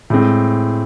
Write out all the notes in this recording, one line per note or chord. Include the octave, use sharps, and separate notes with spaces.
A2 G#3 C4